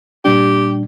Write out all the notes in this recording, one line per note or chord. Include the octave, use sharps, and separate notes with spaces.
A#2 G3 D4 G4